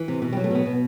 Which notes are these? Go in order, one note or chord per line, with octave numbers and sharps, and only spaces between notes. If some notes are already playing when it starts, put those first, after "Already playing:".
Already playing: E3
C3
B2
G3
F#3
A3
B2 B3
B2